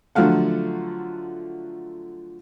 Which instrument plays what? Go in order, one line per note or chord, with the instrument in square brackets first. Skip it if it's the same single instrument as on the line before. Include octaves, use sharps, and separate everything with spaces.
[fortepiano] D3 F3 F#3 A3 F5 F#5